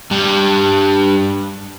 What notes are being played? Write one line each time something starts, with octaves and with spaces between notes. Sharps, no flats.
G2 G3